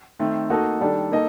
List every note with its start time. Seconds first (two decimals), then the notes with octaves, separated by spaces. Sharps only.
0.19 D#3 A3 C4
0.50 A#3 D#4 F#4 A4 D#5
0.81 D#3 G3 D4 A4
1.12 A#3 D#4 A4 D#5